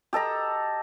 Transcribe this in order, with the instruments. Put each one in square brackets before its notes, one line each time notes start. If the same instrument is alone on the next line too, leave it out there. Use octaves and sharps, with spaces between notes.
[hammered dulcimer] G4 A4 D#5 A#5